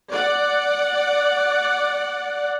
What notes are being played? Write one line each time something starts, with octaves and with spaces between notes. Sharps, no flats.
D5 F#5